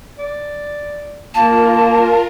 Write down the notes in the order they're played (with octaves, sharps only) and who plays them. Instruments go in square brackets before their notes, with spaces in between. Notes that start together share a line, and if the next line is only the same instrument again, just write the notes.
[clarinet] D5
[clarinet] A#3 [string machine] F4 A#4 [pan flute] A5